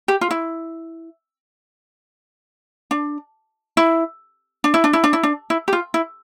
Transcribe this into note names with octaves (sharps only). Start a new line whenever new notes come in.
G4
F4
E4
D4
E4
D4
E4
D4
E4
D4
E4
D4
E4
G4
F4
E4